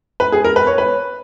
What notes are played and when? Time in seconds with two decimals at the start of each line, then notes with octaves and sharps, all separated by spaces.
0.20 B4
0.32 G#4
0.44 A#4
0.56 B4
0.67 C#5
0.78 B4